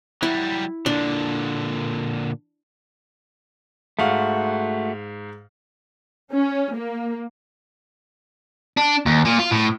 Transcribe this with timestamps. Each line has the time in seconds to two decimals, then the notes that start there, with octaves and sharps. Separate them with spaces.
0.23 F#3 G3 E4
0.86 A#2 D3 D4
3.99 G#2 A3 F#4 F5
6.34 C#4
6.76 A#3
8.77 D4
9.06 D#2
9.26 A#2
9.40 F4
9.52 A2